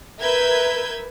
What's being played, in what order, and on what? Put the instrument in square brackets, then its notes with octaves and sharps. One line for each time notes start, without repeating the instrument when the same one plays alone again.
[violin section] A#4 B4 E5 E6 G6 G#6